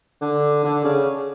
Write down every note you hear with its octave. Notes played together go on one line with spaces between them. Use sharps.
D3
D3
C#3